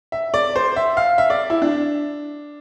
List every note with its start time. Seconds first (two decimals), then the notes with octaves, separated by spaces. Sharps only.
0.12 E5
0.34 D5
0.56 C5
0.76 E5
0.97 F5
1.18 E5
1.30 D5
1.50 E4
1.62 D4